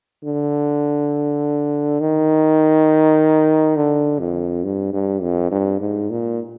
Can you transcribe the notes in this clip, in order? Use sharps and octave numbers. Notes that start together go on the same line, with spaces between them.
D3
D#3
D3
F2
G2
G2
F2
G2
G#2
A#2